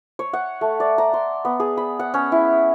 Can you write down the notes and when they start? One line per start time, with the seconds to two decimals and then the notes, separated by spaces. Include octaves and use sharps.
0.19 C#5
0.33 F#5
0.61 A3
0.80 D5
0.98 A#5
1.13 C6
1.45 B3
1.60 G#4
1.77 B5
1.99 F#5
2.14 C#4
2.32 E4